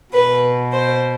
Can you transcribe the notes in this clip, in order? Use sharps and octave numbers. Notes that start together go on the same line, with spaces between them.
B2 B4
C5